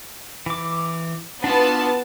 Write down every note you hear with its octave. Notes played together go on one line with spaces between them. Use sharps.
E3 D6
B3 D4 E4 F4 A5